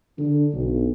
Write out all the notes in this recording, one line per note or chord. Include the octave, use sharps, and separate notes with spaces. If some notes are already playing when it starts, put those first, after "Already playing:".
D3
B1